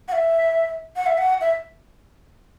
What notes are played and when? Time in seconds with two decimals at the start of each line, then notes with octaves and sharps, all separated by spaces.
0.08 F#5
0.12 E5
0.96 F#5
1.06 E5
1.18 F#5
1.41 E5